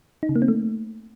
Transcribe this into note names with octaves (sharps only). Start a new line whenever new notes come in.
D#4
C#3
A#3
C4
A3